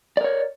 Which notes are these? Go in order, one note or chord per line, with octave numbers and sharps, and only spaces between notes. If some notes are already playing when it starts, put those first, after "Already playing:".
A#4 C#5 D5